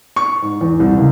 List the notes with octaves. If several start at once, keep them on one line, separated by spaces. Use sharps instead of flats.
C#6
G#2
E2
C2
C#2